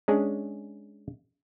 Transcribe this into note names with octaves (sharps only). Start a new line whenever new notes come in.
G#3 C#4 D4 G#4